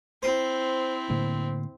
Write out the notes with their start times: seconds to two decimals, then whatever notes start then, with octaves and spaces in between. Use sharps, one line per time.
0.23 C4 E4 C5
1.10 A2 D3 A#3